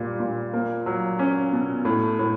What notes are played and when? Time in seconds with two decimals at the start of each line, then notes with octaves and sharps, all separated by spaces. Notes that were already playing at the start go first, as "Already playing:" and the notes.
Already playing: A#2 G3
0.20 A#2
0.53 A#3
0.86 F#3
1.19 C#4
1.53 B2
1.85 A2
2.19 A2